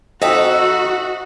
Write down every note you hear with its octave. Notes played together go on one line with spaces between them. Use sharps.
F2 D#4 F#4 D#5 E5